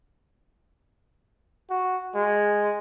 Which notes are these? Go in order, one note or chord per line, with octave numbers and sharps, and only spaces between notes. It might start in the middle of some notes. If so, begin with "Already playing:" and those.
F#4
G#3